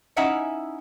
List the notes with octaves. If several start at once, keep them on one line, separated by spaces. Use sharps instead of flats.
C#4 D#4 E4 E5 F#5 G#5